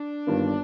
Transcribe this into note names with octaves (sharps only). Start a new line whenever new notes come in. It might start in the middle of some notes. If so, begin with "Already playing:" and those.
Already playing: D4
G1 G2 D#3 A#3 F4